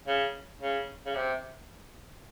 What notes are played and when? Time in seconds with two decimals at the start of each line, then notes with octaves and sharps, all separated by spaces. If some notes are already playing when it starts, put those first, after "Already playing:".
0.08 C#3
0.62 C#3
1.06 C#3
1.15 C3